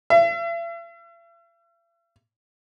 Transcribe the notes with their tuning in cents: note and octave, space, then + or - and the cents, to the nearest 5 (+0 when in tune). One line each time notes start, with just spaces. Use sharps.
E5 +45